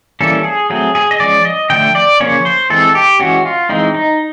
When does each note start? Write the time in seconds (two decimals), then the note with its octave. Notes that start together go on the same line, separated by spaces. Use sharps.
0.21 E3 G3 A#3 C#4 A4
0.44 G#4
0.70 F#3 A3 C4 G#4
0.95 G#4
1.11 D#5
1.20 F3 G#3 C#4 D5
1.45 D#5
1.70 D3 F3 A3 G5
1.95 D5
2.20 C#3 F3 A#3 C#4 C#5
2.45 C5
2.70 E3 G#3 C4 A4
2.95 G4
3.19 E3 G#3 C#4 F#4
3.45 F4
3.69 E3 G#3 C4 D#4
3.94 D#4